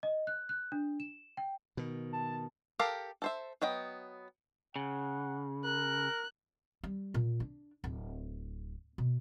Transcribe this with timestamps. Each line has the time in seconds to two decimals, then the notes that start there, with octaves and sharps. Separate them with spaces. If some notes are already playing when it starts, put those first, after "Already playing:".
0.03 D#5
0.27 F#6
0.49 F#6
0.72 D4
1.00 E7
1.37 G5
1.77 B2 D#3
2.13 A5
2.79 G4 A4 A#4 F5
3.22 A4 C5 E5
3.62 F#3 B3 D#5 G5
4.76 C#3 F#5
5.65 A#4 F#6
6.84 G3
7.14 A#2
7.40 D4
7.84 D1
8.98 B2